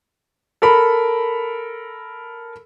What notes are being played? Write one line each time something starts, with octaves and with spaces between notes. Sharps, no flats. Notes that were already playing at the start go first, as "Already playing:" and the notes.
A4 A#4 B5